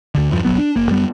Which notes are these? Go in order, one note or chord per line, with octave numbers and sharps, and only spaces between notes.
D2 D3
E2 G2 F3
F1 A#1 F#3 B3
D4
F#1 A#3
F#2 G3 B3